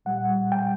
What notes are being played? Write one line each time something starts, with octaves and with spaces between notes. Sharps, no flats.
A#2 G3 F#5
G5